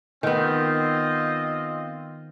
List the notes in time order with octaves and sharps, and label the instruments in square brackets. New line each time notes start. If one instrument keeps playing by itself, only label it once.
[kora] D#3 B3 [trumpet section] C4 F4 D#5